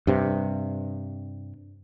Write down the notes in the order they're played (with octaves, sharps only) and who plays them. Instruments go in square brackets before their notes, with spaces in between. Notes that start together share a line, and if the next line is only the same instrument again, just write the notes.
[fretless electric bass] G2 C3